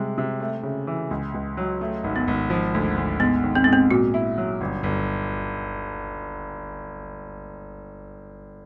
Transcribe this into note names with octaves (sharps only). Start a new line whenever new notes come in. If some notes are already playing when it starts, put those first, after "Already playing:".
Already playing: C3 G3 G#3
C3
A3
C#3
E3
C#2
C#2
F#3
A3
G#1
B3
G#1
F3
D2
D2
G#2 B3
D#3
C4
G#2 B3
C4
A#2 F#4
E4
F#3
G1
G1